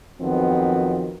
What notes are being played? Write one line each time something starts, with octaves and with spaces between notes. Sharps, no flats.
F2 D#3 F3 F#3 B3 C4